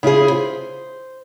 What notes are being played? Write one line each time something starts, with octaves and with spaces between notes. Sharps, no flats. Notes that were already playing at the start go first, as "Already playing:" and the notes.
C#3 E4 F4 G#4
C5